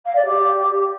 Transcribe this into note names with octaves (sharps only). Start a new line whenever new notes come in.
F5
D5
G4